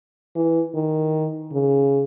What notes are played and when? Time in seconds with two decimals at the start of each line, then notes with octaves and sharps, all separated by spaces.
0.35 E3
0.74 D#3
1.52 C#3